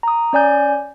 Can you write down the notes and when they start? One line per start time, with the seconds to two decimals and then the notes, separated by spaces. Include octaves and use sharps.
0.03 A#5 D#6
0.33 C#4 D5 G#5 G6